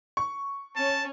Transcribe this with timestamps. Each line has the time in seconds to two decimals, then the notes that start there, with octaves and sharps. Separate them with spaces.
0.17 C#6
0.76 C#4 C#5 A5